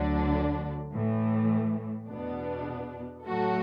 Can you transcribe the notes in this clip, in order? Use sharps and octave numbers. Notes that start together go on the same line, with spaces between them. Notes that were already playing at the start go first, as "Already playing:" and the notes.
Already playing: D2 D3 F#3 D4
A2 E3 A3
E2 B2 B3 D4
A2 F#3 A3 F#4 A4